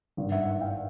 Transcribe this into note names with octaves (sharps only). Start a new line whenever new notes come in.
G#1 G2 D#3
E5 F#5
E5 F#5
F5 G5